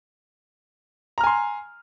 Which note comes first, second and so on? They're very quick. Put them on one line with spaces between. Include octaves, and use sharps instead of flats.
A#5 F6 G#5 C6